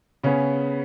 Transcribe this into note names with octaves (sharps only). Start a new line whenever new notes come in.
C#3 B3 C#4